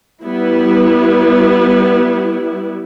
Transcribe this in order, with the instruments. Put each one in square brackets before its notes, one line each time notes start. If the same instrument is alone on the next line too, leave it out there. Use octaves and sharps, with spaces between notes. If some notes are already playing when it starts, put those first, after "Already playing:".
[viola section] G3 B3 E4